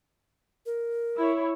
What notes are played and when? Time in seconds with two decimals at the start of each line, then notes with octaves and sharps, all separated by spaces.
0.66 A#4
1.18 E4 C#5